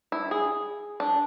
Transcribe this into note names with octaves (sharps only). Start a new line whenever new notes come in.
E4
G#4
D4